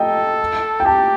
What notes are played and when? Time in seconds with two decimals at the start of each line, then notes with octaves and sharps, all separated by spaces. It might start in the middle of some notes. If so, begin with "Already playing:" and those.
Already playing: A4 D#5 G5
0.80 G5
0.86 G4 A5